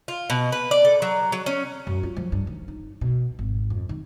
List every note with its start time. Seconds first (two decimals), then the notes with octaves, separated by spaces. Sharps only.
0.08 F4
0.30 B2
0.52 B4
0.71 D5
0.85 A4
1.02 F#3
1.32 F#3
1.46 C#4
1.87 F#2
2.03 F4
2.17 F3
2.32 G2
2.47 D#3
2.68 D#4
3.01 B2
3.39 G#1
3.70 F2
3.89 D#3